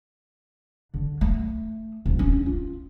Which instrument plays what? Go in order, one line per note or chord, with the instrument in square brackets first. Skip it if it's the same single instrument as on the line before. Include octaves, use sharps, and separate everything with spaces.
[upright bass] D3
A3
D1
C#4
F4